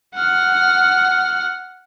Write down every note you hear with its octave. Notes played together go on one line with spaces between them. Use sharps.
F#5 F6